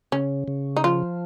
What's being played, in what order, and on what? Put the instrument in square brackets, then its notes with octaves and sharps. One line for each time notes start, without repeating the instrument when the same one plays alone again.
[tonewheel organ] C#3 [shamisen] C#4
[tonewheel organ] C#3
[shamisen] D#4
[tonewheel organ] F3 [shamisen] F4